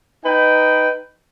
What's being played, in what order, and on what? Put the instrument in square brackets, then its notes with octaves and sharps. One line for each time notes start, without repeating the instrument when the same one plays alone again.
[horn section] D#4 B4 G5